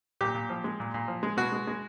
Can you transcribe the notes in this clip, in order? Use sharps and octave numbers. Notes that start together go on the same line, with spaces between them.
A#2 G4
A#2
F3
G#3
A#2
A#2
F3
G#3
B2 F#4
G#3
G#3